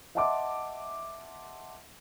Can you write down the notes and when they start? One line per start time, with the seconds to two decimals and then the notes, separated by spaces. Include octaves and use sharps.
0.15 D#5 E5 F#5 A5 C6 D6